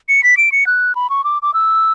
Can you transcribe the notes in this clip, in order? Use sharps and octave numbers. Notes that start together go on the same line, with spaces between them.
C#7
B6
D7
C#7
F#6
B5
C#6
D6
D6
E6